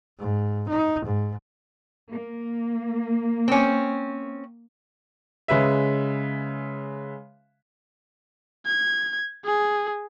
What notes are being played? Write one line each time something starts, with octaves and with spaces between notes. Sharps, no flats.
G#2
D#4
G#2
A#3
C4 C#4
C#3 G#3 B4 E5
G#6
G#4